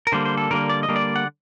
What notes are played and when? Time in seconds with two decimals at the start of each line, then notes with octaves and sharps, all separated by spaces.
0.07 A#4
0.12 D3 G3 A#3 C5
0.25 C5
0.38 A4
0.51 D3 G3 A#3 A#4
0.69 D5
0.83 D#5
0.88 D3 G3 A#3
0.96 D5
1.16 F#5